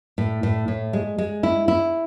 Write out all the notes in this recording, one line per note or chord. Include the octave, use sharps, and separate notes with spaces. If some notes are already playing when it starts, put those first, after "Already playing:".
A2
A2
A2
G#3
G#3
E4
E4